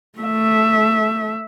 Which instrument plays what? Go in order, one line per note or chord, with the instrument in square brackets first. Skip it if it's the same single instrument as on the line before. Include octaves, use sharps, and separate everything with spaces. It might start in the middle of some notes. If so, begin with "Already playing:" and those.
[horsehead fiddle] A3 E5